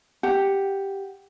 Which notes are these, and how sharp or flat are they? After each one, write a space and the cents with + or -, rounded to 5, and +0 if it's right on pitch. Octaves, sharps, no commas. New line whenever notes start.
G4 +0 F#5 +0